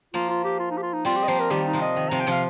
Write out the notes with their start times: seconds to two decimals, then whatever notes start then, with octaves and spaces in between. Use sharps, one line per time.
0.14 F3 A#3 F4
0.30 F4
0.44 G4
0.59 F4
0.71 D#4
0.77 G4
0.83 F4
0.93 D#4
1.05 G3 C4 F4
1.16 G4
1.23 D#5
1.28 F3 A#3 C5
1.40 A#4
1.50 D#3 G3 G4
1.66 D#4
1.73 C3 F3
1.82 D#5
1.96 D#3
2.09 C3 F3 A#5
2.20 G5
2.27 C3 F3 F5